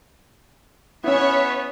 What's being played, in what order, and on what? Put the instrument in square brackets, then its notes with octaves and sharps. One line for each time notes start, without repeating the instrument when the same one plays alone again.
[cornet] B3 [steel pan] C#4 E4 [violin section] C#5 E5